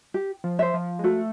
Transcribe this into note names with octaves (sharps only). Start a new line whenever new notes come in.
G4
F3
C5 E5
F3
G#3
A3 F#4